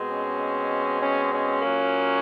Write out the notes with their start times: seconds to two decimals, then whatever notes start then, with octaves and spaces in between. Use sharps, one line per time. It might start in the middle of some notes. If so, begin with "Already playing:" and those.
Already playing: B2 G#3 C4
0.09 C#4
1.01 C#4
1.32 C#4
1.62 A#2 F#3 A#3